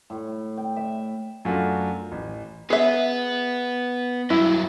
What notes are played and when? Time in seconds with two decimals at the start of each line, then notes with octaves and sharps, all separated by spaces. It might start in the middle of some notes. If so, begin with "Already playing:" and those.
0.10 A2
0.57 G5
0.76 E5
1.45 F#2 A3 D4 F4 F#4
2.12 A1
2.70 B3 G#4 E5
4.30 G2 F#3 E4